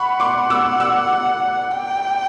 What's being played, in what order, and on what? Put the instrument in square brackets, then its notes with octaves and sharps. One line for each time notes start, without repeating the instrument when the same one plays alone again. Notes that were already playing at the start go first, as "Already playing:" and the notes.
Already playing: [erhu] F#5 [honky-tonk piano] B5 C#6
[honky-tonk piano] C6 D6
D6 E6
D6 E6
[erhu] G5